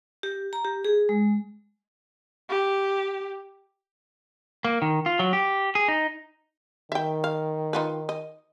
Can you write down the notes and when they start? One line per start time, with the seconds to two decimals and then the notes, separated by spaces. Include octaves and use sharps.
0.23 G4
0.53 A#5
0.65 G4
0.84 G#4
1.09 G#3
2.49 G4
4.65 A#3
4.82 D#3
5.06 F4
5.19 F#3
5.33 G4
5.75 G#4
5.88 D#4
6.92 D#3 E5 G5
7.24 F5
7.73 D#4 F4 B4
8.09 D#5